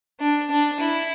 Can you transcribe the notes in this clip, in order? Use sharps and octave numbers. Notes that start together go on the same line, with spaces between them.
D4
D4
E4